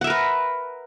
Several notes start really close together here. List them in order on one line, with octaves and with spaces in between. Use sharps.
F#5 E5 A#4 B4